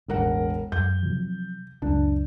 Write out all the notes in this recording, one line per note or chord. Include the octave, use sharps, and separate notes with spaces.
E1 A1 A#4 F#5
F#2 G6
C3 F3 F#3
C#2 F#2 G#3 D4